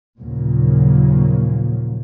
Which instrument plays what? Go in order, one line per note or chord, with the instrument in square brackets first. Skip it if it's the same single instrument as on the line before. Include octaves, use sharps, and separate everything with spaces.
[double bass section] D#2 A#2 C#3 F3 F#3 A#3